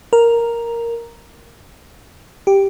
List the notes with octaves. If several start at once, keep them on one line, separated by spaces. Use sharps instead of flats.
A#4
G4